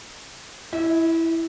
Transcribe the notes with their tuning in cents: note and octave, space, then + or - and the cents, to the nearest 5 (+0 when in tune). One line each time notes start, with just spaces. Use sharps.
E4 +0 E5 -45